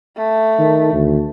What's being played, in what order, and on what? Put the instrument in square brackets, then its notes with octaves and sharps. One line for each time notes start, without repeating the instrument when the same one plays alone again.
[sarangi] A3
[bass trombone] D#3
D2